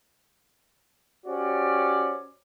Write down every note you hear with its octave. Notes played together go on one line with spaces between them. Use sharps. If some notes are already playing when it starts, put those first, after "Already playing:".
C#4 F#4 G4 C5 D5